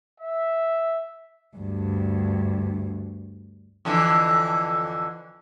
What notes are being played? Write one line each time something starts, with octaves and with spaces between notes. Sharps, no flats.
E5
D2 G2
F2 D3 E3